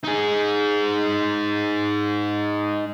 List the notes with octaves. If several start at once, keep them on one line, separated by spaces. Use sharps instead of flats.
D#4 G#4